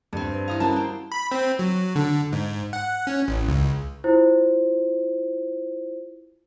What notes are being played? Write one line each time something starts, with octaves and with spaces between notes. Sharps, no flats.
G2 C4 A4
B4
E3 E4 F5 A#5 D#6
G3 A#3 C#4 E4 F#4 A5
C5 G5
B5
C4
F#3
D3
G#2
F#5
C#4
A1
C#2
E4 F4 C5